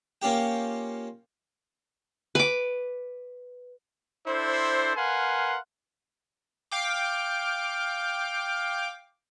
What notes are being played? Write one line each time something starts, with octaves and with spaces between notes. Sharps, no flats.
A#3 C#4 F4 G4 G5
B4 D6
D4 E4 A4 C5
A#4 B4 F5 F#5 G#5 C6
F5 G5 D6